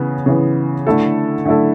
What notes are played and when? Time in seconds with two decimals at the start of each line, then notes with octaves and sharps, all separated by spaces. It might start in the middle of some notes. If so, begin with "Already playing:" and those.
Already playing: C#3 E3 B3
0.26 C#3 E3 B3
0.87 D3 A3 E4 A4
1.45 D3 A3 E4 A4